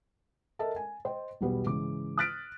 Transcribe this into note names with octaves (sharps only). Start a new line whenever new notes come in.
A4 A#4 D#5 E5 A5
G#5
C5 D#5 G5
B1 E2 B2 G3 B3
G#2 C#3 E3 D6
D#6 F6 F#6 A6 B6 D7